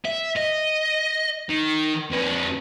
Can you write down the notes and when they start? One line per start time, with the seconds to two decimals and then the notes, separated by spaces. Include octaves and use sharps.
0.05 E5
0.37 D#5
1.49 D#3
2.10 F2 B4